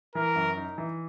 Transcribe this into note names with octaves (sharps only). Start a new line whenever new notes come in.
E3 A#4
F#2
D#4
E3